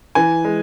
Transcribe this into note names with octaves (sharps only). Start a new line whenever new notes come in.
E3 G#5
G#3